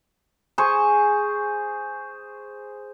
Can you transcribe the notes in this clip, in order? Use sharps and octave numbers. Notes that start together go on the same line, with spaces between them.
G#4 C5 C#6